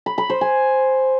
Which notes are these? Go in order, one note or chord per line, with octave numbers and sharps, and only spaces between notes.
B5
B5
C5
G#5